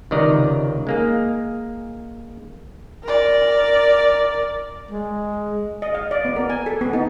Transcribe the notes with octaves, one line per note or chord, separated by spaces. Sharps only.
C#2 C3 D#3 D5 D#5 A#5
G#3 A#3 G#4
A#4 D5
G#3
D#5
F5
D5
B3
A#4
G#5
A4
B3
D#4